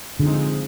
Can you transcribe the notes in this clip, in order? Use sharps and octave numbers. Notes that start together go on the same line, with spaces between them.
D3 F3 G#3 C4 D#4